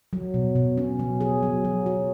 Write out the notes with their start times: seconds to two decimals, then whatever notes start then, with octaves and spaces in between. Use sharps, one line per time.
0.13 F#3
0.34 B2
0.55 B2
0.77 C#4
0.99 F#3
1.21 G#4
1.43 F#3
1.64 F#3
1.86 F#4